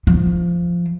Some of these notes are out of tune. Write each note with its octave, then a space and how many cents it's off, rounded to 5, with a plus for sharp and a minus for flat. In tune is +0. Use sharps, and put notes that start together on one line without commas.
F3 -10